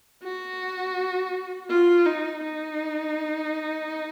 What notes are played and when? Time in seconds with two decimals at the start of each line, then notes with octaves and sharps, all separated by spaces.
0.23 F#4
1.69 F4
2.06 D#4
2.43 D#4